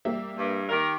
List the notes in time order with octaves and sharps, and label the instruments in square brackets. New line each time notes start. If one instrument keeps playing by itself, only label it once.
[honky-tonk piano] G3 A#3 E5
[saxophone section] G2
D#3 G4 A#4